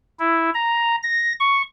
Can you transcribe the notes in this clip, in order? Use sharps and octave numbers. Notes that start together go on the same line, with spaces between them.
E4
A#5
A#6
C#6